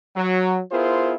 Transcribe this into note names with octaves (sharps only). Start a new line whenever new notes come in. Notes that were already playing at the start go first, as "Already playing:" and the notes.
F#3
B3 E4 F4 G#4 A#4 C5